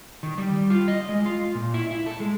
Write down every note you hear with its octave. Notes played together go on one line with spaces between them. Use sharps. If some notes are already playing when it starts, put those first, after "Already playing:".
D#3
G3
F4
D#5
G#3
F4
A#2
E4
E4
A4
G#3